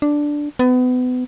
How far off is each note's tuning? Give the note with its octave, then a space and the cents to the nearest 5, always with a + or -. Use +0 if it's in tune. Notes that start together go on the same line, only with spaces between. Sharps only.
D4 +0
B3 +30